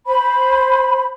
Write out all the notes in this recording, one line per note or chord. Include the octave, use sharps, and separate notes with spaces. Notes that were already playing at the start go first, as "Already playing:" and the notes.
C5 B5